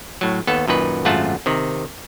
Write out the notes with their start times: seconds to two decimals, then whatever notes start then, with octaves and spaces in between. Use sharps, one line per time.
0.21 A2 F#3
0.47 D#2 B3 A4 A5
0.68 F#2 A#2 D#3 B4
1.05 G#1 F#2 A3 F4 F#5 A5
1.46 C3 D#3